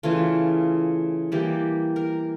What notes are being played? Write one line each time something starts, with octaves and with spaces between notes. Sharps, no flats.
C#3 E3 A3 F4
E3 G3 A#3 G4
A#4